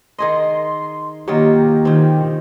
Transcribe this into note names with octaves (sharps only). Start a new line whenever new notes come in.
D#3 G#4 D#5 C6
D#3 F#3 A#3 D#4 F4 G4
A#2 D#3 C4